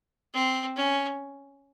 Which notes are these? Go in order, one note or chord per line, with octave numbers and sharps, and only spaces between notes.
C4
C#4